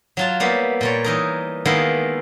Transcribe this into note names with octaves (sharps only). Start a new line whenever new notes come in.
F#3 F4 A5
G3 A#3 B3 E4
A#2 G3 C#5
E3 D#4 A#4
D#3 G#3 A#3 B3 E4